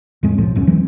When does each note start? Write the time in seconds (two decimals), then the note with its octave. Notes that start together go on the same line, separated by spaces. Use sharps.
0.23 E2 A2 G#3 C4
0.38 B1 A2 F3
0.55 F1 C#2 F#2 C#4
0.67 E3 F#3 G#3 C4